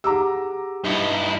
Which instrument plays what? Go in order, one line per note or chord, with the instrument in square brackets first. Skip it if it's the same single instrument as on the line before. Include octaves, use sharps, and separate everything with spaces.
[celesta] G4 G#4 F#5 [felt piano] A#5 D6 E6
[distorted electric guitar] G2 [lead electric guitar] D#4 E4